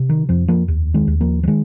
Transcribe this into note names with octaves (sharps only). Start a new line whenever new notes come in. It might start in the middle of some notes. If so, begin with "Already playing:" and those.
Already playing: C3
D#3
F2 F3
F3 A#3
D#2
D#3 G#3
D#2
F3 A#3
F3
D#3 G#3